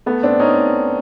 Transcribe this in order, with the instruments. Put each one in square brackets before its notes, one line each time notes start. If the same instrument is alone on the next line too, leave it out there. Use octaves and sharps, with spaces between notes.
[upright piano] A3 B3
C4 D4
C#4 D#4